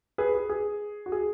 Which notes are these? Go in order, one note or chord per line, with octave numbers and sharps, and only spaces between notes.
G#4 B4
G#4
G#4
F#4
G#4